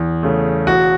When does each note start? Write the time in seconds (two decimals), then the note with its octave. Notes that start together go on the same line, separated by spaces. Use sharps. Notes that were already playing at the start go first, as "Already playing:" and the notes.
Already playing: E2
0.23 C#3 A3
0.67 E1 F#4